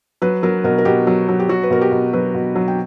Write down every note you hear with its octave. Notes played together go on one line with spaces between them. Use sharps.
F#3 B4
F#3 A#4
B2 A#4
A#4
B2 G4
F#3
F#3
G4
F#3 F#4
B4
B2 A#4
G4
B2
F#3 B4
B2
F#3
G5